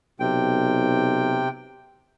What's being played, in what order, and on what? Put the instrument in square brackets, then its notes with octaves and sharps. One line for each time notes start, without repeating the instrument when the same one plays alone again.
[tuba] B1 [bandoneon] C3 G5